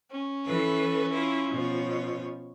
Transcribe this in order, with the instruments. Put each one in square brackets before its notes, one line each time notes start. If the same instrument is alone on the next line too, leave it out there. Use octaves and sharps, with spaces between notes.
[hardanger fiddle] C#4
[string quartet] E3 A4 B4
E4 F4
B2 F3 C#5